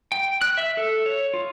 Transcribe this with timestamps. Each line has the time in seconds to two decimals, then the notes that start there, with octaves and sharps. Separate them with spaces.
0.12 G5
0.42 F#6
0.58 E5
0.77 A4
1.06 C#5
1.34 F4